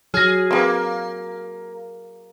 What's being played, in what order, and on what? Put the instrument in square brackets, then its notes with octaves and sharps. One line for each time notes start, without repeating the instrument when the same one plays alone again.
[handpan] F#3 [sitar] G#4 [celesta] F6 A#6
[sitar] A#3 [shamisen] C4 G#4 B4